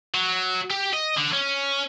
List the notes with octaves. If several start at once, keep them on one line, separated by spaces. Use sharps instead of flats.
F#3
G4
D#5
D3
C#4